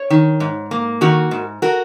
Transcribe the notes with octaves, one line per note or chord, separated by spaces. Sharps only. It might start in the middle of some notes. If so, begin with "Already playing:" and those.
Already playing: C#5
D#3
G#2
A#3
D#3 F#4 A#4
G#2
F#4 A#4